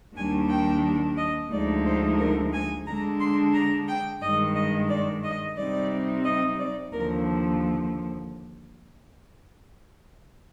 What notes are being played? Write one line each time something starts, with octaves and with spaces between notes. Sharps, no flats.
D#2 D#3 G3 D4 G#5
G5
D#5
D2 D3 F3 G#3 D#4 D5
C5
A#4
G#5
D3 G#3 D4 A#5
C6
A#5
G5
G2 D#3 G#3 D#5
D#5
D5
D#5
C3 G3 C4 D#4 D5
D#5
D5
D#2 D3 F3 A#4